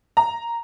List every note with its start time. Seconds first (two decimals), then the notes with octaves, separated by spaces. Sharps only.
0.17 A#5